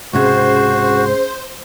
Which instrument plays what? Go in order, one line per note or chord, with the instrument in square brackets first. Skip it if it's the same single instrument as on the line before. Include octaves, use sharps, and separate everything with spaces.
[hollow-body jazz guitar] C#2 G#2 C3 [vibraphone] C#4 G#4 [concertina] F#4 [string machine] C5